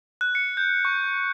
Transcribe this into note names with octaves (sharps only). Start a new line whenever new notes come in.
F#6
C#7
G6
C#6